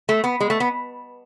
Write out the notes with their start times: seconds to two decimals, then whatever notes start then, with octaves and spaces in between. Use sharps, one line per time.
0.09 A3
0.24 B3
0.40 G#3
0.50 A3
0.60 B3